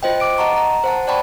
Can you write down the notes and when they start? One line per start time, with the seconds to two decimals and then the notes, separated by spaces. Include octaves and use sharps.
0.03 F4 C5 D#5 G5
0.20 D6 D7
0.38 D#5 F#5 A5 A#5 C#6
0.56 A#5
0.84 C5 F#5 A5
1.07 C5 D5 G5 A5 B5 C#6